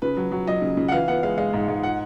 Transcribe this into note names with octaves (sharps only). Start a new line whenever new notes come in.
C#3 B4
F#3
F#3
F#3 D#5
C#3
C#3
F#5
E3 F5
B3 F#5
G#3 F5
G#3 F5
G#2
G#2
F#5